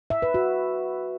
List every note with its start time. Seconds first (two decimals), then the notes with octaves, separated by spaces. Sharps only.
0.10 E5
0.22 B4
0.34 F#4